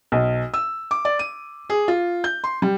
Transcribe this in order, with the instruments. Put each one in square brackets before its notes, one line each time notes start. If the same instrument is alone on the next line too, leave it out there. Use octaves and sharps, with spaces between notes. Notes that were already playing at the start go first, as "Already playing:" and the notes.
[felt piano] B1
E6
D6
D5
D#7
G#4
F4
G6
C6
G3